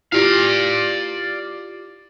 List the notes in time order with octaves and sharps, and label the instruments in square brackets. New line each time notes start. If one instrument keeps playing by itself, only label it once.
[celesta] E4 F4 G4 [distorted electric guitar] D5 F5